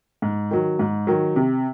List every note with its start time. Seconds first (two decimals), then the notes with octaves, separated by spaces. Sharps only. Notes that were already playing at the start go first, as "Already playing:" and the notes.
0.22 G#2
0.51 D#3 F#3
0.79 G#2
1.07 D#3 F#3
1.36 C3